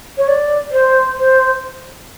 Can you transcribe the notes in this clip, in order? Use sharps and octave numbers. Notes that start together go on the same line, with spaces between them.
C#5
D5
C5
C5